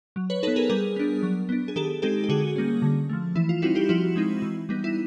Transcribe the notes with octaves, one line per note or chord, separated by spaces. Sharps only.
F#3
B4 C#5
B3 D#4 A4 B4
G#4 A#4
G3 G#4 A#4
B3 D4
F#3
B3 D4
G#4
D#3 G4 A4
G#3 C4 D#4 G4 A4
G4
D3 F#4 G#4
G3 A#3 C#4
D3
F3 A3
E3 E4
F4
G3 C4 D#4 E4 F#4
F4 G4
F3 E4 F#4
G#3 C4 D#4
E3
G3 B3 D#4
E4